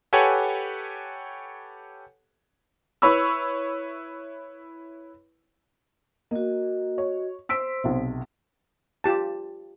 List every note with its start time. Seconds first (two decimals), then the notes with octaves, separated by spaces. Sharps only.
0.13 G4 A4 B4 C#5 F#5 G#5
3.02 E4 B4 C#5 B5 C#6 E6
6.31 A#3 F#4 D#5
6.98 C#5
7.49 C5 C6 E6 B6 D7
7.84 B1 C3
9.04 F4 G4 A5